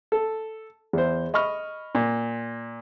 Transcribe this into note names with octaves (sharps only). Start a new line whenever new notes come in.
A4
E2 C5
D#5 B5 C#6 F6
A#2